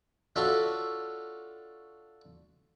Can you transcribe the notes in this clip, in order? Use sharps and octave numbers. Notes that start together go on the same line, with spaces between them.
D4 F4 F#4 A4 C#5 E5